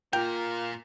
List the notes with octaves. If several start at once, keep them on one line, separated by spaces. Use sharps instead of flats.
A#2 A#3 F4 A#4 G5